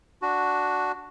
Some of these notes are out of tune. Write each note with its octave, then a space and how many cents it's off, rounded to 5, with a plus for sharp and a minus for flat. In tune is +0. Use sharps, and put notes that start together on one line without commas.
D4 +0 F#4 +0